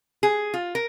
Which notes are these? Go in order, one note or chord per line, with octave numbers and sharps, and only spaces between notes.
G#4
F4
A#4